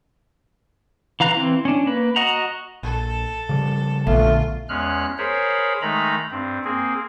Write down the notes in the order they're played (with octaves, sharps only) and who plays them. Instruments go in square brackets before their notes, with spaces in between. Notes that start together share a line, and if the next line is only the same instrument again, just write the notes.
[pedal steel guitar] E3 F5 A#5 F#6
E3 C4
C#4 D4
A#3 B4
F#4 D#5 F#5 A#5
[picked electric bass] A#1 [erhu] A4
[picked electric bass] C#3 F3 G3
[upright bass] A#1 [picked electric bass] D3 B3 [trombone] A3 [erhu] F4
[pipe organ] E2 G#3 C#4 F6 F#6
G#4 A#4 C5 C#5 B5
D#3 G#3 A3 D#4 A#5 B5
G2 C4
A#3 C4 G#4